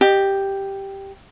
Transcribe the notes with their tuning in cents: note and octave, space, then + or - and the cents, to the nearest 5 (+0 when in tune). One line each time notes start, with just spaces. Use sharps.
G4 +0 D#5 -25